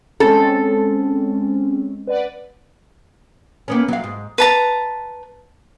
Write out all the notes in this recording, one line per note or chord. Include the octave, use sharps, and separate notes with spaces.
G#3 C4 C#4 A4
B4 D5 F#5
A#3 B3 C#4
F#3 F5
G#2
B4 A5 A#5